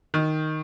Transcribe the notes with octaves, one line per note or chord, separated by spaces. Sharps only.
D#3